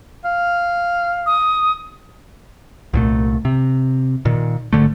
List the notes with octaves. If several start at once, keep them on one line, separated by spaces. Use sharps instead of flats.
F5
D#6
C2 A#2 A3
C3
A#2 D#3
G#1 G#2 D3 A3